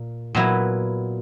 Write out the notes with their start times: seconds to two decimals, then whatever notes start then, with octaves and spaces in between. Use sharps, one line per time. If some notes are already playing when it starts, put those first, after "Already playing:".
Already playing: A#2
0.35 A#2 F#3 B3 E4